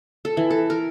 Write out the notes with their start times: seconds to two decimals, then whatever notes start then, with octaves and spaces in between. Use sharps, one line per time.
0.25 A4
0.37 E3
0.50 A4
0.70 A#4